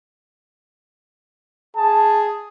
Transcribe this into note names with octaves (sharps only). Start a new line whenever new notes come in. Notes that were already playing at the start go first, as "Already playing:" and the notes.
G#4 A5